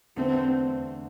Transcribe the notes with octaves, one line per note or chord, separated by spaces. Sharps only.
E2 D3 A3 C4